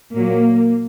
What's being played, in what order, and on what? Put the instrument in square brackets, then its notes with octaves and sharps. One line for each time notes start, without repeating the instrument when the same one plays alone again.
[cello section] A#2 F#3 A#3